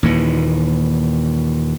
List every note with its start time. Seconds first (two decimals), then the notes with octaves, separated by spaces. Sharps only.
0.03 D#2 A#2 E3